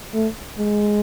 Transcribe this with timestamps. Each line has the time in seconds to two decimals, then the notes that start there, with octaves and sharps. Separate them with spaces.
0.13 A3
0.58 G#3